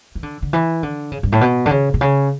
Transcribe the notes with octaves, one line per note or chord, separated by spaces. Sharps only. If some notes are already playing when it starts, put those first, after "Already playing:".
E3
D3
D3
E3
D3
C#3
G2
A2
B2
D3
C#3
B2
C#3